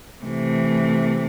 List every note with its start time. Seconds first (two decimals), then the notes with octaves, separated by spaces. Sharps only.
0.21 C3 E3 A3